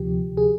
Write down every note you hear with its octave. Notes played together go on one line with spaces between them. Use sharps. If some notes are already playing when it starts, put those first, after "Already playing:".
Already playing: D2 C3 F3 G4
G#4